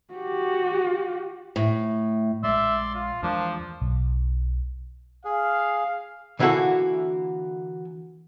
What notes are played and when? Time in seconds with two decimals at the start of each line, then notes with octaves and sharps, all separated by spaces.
0.14 F#4 G4
1.56 A2
2.44 A#1 G#3 D5 E5 C6
2.95 F4
3.22 E2 E3 F3 G#3 A#3 D4
3.81 B1
5.25 G#4 F5
6.39 D3 E3 A#3 E4 F#4 A4